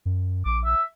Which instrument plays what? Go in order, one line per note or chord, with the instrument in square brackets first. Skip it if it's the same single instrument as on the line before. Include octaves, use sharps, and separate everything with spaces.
[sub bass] F#2
[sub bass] A#1 [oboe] D6
[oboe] E5